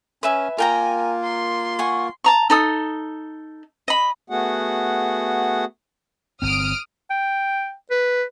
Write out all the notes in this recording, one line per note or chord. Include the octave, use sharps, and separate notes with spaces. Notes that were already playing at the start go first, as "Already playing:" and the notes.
C#4 B4 E5 G#5
A#3 F4 A#4 G5 G#5 A#5
C6
F#5 G#5 C#6
A5 A#5 C#6
D#4 A4 D#6
D#5 B5
A3 B3 F#4 G#4 F#5
G1 C4 D#6 F6 D7
G5
B4